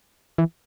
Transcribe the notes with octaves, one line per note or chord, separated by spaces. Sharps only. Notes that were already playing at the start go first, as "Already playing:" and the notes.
E3